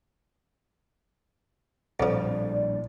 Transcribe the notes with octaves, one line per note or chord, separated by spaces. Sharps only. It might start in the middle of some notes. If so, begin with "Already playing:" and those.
A#1 F2 A2 F3 G3 D5